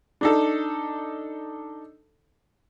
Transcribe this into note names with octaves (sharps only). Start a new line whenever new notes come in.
D4 D#4 A4